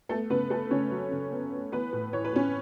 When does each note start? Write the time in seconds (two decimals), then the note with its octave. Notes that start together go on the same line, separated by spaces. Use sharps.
0.09 A3 B3 A4
0.30 C#3 B3 B4
0.50 A3 B3 A4
0.71 C#3 C#4 C#5
0.91 F#3
1.11 C#3
1.32 B3
1.52 B3
1.72 E3 B3 B4
1.92 A2
2.13 E3 C#5
2.25 B4
2.33 A2 C#4 C#5